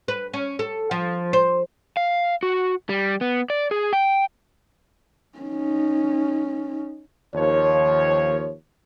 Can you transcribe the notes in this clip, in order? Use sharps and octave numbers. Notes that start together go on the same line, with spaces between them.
B4
C#4
A4
F3
C5
F5
F#4
G3
B3
D5
G#4
G5
C#4 D#4
D#2 F3 C#5